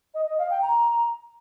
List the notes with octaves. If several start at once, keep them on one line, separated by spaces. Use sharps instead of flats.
D#5
D#5
F5
G5
A#5